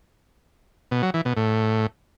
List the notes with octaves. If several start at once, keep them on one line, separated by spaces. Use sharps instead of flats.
B2
F#3
E3
B2
A2